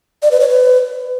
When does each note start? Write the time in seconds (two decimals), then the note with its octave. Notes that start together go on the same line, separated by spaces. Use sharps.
0.22 D5
0.31 B4
0.40 C#5
0.49 B4